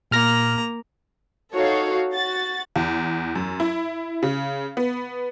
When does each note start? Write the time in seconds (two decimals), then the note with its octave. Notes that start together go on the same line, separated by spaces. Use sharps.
0.11 A#2 A#3 A#5 F6 A#6
1.54 D#4 F#4 A4 C#5 F5
2.14 F#4 A6
2.76 E2
3.35 F#2
3.60 E4
4.23 C#3
4.77 B3